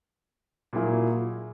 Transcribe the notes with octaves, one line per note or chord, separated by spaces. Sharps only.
A#2 F#3 A#3 E4 G#4